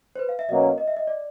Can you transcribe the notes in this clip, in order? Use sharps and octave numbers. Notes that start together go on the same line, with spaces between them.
C5
B4
F5
E5
B2 F#3 A#3 C#4 D#5
D#5
E5
D#5
D5